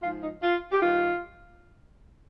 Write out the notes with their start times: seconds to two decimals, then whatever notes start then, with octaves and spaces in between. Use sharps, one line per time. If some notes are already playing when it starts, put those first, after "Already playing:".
0.03 G#2 F3 F4
0.23 D#4
0.43 F4
0.71 G4
0.82 G2 D#3 F4